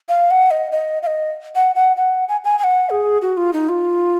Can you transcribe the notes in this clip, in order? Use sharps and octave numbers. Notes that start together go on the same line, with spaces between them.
F5
F#5
D#5
D#5
F5
D#5
F#5
F#5
F#5
G#5
G#5
G#5
F#5
G#4
F#4
F4
D#4
F4